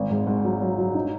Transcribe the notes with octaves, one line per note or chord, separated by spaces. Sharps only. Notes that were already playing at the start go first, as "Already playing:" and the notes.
Already playing: G#1
G#2
G#2
F#3
F#3
F#3
D#4